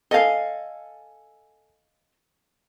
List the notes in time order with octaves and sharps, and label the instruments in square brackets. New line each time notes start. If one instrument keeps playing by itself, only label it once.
[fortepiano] A4 G#5 [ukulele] D#5 F5